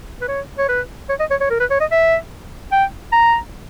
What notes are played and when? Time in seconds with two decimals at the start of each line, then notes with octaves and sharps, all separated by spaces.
0.21 B4
0.29 C#5
0.58 C#5
0.69 B4
1.09 C#5
1.20 D#5
1.31 C#5
1.41 C#5
1.50 A#4
1.60 B4
1.71 C#5
1.80 D#5
1.91 E5
2.72 G5
3.13 A#5